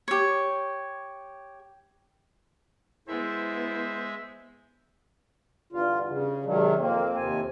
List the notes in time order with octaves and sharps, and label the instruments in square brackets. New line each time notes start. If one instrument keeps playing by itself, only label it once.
[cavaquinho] G4 C#5
[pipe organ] G#3 E5 [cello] B3 [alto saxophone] E4 [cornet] C5
[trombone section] E2 G2 D3 [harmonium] F4
[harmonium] C#3
[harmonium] C3 D#3 F#3 [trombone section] G#3 D4
[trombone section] F2 C4 [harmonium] A#3
[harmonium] D#2 C3 G#5